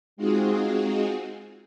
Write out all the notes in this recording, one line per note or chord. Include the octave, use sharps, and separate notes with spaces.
G#3 C4 D#4 F4 F#4 G#4